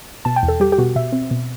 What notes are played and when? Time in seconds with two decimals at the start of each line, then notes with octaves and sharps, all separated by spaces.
0.25 B2 A5
0.36 G5
0.43 E2
0.48 A4
0.60 G3 G4
0.72 G4
0.78 B2 F#4
0.96 B2 E5
1.12 C4
1.31 B2